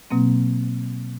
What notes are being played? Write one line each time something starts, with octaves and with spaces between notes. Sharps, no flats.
B2 F#3 A#3 C4